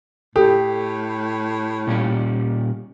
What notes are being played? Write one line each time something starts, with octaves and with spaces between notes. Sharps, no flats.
A2 G4 A4
A#2 G3 C#4